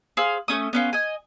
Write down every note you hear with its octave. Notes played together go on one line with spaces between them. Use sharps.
G#4 C5 F5 E6
A3 C#4 D#6
B3 C#4 F4
D#5 G#5